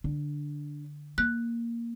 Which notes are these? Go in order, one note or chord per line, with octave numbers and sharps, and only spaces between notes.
D3 D4
A#3 F#6